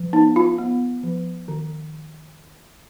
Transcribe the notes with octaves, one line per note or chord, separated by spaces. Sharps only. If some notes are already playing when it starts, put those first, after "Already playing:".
Already playing: F3
B3 D#4
F4
B3
F3
D#3